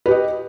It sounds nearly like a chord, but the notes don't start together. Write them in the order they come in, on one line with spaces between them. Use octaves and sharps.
B4 G4 D#5